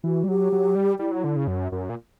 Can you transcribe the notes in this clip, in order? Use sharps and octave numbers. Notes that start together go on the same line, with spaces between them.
E3 F#4
G3
F#3 G4
F#3
G3
G3 E4
F#3
D3
C#3
F#2
F#2
A#2